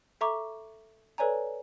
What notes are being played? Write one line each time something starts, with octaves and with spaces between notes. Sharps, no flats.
A4 E5 A#5 C#6 D6
A4 B4 C#5 D5 G#5 A#5